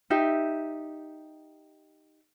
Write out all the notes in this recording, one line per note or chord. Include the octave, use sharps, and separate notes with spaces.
D#4 G4 E5